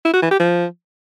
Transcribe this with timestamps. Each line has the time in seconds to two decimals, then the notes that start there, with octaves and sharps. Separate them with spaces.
0.05 E4
0.14 F#4
0.22 E3
0.31 G4
0.40 F3